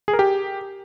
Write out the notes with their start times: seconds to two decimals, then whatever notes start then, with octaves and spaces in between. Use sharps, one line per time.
0.08 G#4
0.13 A#4
0.19 G4